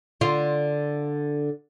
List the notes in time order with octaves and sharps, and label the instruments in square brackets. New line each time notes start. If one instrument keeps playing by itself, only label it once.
[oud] D3 F4